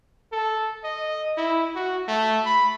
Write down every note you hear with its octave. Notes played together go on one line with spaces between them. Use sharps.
A4
D#5
E4
F#4
A3
B5